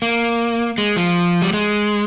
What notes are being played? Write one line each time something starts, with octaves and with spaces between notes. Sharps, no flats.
A#3
G#3
F3
G3
G#3